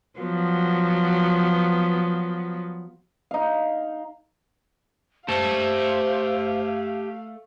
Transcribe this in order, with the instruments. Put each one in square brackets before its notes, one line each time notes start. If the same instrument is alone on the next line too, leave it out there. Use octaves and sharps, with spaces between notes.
[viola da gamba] F3 F#3 B3
[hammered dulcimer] D#4 F5
[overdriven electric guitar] A3 [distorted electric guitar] G4 A5 [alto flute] C5 [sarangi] F5